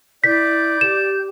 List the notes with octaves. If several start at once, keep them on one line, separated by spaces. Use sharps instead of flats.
E4 D5 G6 B6
G4 E7